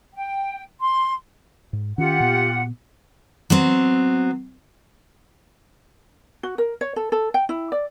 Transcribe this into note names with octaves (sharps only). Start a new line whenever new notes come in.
G5
C6
G#2
D#3 C#4 F4 G4 F#5
A#2 B3
F#3 B3 C4
F#4
A#4
C#5
A4
A4
G5
E4
D5